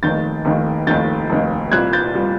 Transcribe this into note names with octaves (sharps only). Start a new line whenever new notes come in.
F1 D#2 D#3 G6 A6
F1 D#2 D#3
F1 D#2 D#3 G6 A6
F1 D#2 D#3
C2 A#2 G3 F#6 G#6
G6 A6
A#2 G3